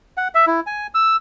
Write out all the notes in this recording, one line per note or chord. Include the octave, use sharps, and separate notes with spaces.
F#5
E5
E4
G#5
E6